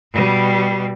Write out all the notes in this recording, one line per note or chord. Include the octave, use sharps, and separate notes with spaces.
B2 G3